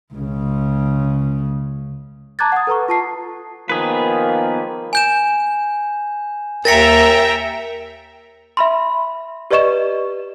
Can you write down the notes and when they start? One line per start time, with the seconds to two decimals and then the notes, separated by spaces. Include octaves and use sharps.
0.14 C#2 C#3
2.39 A5 A#5 D6 F#6 G#6 A6
2.52 F#5 D#6
2.67 A4 B4 A#5 C#6
2.88 F4 A5 C7
3.69 D#3 F3 A#3 B3 G#4 B4
4.93 G#5 G6 E7
6.65 D#2 A#4 E5 G5 A#5 A6 A#6 C#7
8.57 E5 B5 C6
9.51 G4 B4 D5 D#5 C#6 E7